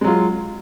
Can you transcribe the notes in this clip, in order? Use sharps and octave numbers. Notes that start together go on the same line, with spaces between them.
F#3 G#3 F4